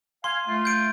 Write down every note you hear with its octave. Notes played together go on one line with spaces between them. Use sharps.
F5 G#5 C6
A3 F4
G6 D7